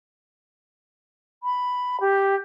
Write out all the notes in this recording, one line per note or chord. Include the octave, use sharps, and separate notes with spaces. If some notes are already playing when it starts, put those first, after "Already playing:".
B5
G4